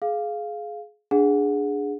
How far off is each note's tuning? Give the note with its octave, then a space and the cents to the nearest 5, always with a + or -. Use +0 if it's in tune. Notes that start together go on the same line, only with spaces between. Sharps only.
G#4 +20 F5 +0
D4 -5 G#4 +0 F#5 -25